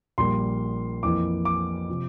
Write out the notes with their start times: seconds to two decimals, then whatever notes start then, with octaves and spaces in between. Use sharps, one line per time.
0.18 A#1 A#2 G3 A#3 C6
1.03 F2 E3 A#3 D6
1.45 D6
1.89 C3 F3